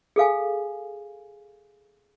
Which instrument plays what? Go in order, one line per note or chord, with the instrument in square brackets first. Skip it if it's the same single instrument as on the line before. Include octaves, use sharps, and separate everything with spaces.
[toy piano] G#4 A4 F5 G#5